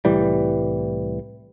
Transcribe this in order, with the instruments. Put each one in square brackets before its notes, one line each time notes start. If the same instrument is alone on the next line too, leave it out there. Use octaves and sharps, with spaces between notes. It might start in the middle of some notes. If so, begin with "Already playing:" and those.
[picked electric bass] C2 A2 E3 G3